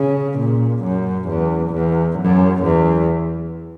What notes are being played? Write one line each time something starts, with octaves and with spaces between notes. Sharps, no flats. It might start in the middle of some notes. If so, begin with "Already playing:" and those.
Already playing: C#3
A#2
F#2
E2
E2
F#2
E2